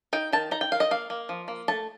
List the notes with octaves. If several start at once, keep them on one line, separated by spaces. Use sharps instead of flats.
D#4 G5
D#3 A5
D#4 A#5
G5
D#3 F5
D#5
A#3 F5
A#3
F3
A#3
A3 A5